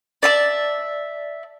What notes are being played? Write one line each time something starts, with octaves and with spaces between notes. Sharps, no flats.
D5 E5 A5